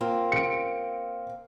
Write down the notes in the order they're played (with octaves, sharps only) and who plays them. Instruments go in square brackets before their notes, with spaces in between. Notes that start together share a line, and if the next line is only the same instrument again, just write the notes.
[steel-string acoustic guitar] A#3 C4 F4
[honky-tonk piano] C#7 D7